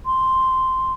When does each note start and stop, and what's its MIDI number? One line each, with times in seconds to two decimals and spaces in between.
0.06 0.93 84